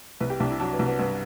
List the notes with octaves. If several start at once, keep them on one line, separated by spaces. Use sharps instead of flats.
C2 B4
G4
C2 D4
E4
F#3 D4
B3
C2
B3
G2 B3